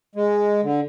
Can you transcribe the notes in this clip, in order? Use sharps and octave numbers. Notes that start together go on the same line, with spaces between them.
G#3
D3